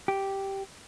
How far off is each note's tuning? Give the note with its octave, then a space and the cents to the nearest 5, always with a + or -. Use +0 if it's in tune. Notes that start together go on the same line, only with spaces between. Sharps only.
G4 -5